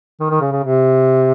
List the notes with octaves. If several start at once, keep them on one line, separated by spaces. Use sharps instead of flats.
D#3
D#3
C#3
C#3
C3